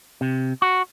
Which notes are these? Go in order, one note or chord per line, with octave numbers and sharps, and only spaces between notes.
C3
F#4